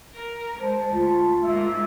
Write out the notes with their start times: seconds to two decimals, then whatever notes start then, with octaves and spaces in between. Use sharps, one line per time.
0.15 A#4
0.60 G#3 C5 A5
0.93 D2 F4
1.44 G#2 A#3 E5